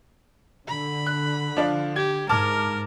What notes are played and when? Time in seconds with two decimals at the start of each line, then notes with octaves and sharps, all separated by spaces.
0.68 D3 B5
1.07 F#6
1.57 F3 D4 F4
1.96 G4 G#6
2.29 G#2 A#4 A5 D6 F6